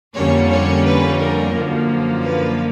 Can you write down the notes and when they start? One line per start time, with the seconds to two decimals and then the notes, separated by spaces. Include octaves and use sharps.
0.15 F2 D3 G3 A#3 C#4 C#5
0.50 C#5
0.85 B4
1.19 A#4
1.53 F#2 D3 F3 A#3
2.23 B4